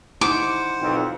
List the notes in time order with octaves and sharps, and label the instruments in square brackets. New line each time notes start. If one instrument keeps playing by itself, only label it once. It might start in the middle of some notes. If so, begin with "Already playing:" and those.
[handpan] D#4 E4 [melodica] C5 F#5 [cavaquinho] D6
[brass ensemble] B1 F2